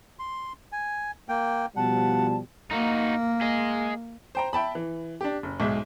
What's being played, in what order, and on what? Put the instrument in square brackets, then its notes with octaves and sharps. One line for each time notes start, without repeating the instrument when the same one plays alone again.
[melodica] C6
G#5
A#3 G5
[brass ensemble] B2 F3 G3 [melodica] F#5 [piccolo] A5
[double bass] A#3 [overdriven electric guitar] D#4 F#4
[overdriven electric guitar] G#4 D#5
[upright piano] C5 G5 A#5
E5 G5 A5 B5
E3
D4 G4
F#1
B1 G#2 G#3 E5